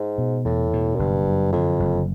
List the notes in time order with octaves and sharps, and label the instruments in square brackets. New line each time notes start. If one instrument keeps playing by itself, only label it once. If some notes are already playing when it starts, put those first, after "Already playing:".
Already playing: [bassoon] G#2
[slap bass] B2
[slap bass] E2 [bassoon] A2
[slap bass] B2
[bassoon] F#2
[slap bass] F#1 [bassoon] G2
[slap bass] F#2
[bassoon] F2 [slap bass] D3
[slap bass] F#1